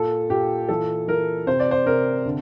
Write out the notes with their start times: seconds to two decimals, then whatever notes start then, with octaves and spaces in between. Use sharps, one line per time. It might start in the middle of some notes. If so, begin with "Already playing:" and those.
Already playing: A#2 A4
0.30 A#2 G4
0.68 E3 A4
1.08 E3 A#4
1.47 C3 C5
1.60 D5
1.71 C5
1.86 C3 A#4
2.26 D3